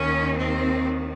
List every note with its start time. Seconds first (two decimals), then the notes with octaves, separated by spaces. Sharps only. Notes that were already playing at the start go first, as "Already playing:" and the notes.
Already playing: D#2 D#3 C#4
0.37 C4